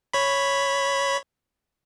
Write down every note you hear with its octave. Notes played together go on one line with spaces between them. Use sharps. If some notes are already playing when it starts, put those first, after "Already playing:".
C#5 B5